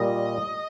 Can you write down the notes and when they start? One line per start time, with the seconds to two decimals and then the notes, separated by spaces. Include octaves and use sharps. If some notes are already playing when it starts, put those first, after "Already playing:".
Already playing: A#2 G3 D#5